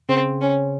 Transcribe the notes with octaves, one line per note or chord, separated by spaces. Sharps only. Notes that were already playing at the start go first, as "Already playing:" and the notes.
C#3 C4
C#4